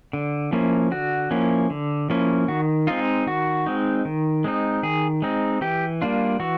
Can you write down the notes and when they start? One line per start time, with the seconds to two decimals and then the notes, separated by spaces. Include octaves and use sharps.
0.13 D3
0.53 F3 A#3 C#4 E4
0.91 D3 F#4
1.31 F3 A#3 C#4 E4
1.70 D3
2.10 F3 A#3 C#4 E4
2.48 D#3 F#4
2.87 G#3 C4 D#4 F4
3.26 D#3 F#4
3.66 G#3 C4 D#4
4.05 D#3
4.44 G#3 C4 D#4
4.83 D#3 G#4
5.22 G#3 C4 D#4
5.61 E3 G4
6.02 G3 A#3 D4 F4
6.40 E3 F#4